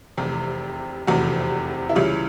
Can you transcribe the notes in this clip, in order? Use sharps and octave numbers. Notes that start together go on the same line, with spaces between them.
F1 E2 C3 G4
F1 E2 C3 F#4
E4
C#2 C#3 E3 G3 F4